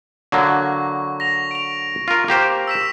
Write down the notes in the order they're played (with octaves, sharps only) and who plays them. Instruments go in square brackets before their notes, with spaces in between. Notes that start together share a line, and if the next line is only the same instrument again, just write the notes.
[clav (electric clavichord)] D3 F#3 A#3 [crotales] C#6
[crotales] A#6 F7
D7 F7
[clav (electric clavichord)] F4 A#4
A#3 G4 C5
[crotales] E6 B6 E7